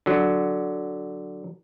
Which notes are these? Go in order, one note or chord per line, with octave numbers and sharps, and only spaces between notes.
D3 F#3